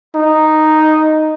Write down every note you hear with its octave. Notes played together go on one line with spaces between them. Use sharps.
D#4